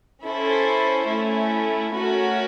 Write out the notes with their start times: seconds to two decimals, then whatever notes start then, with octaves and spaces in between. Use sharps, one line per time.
0.24 C#4 E4 A4 C5
1.08 A3 C#4 E4
1.94 A3 C#4 F#4 A#4 C#5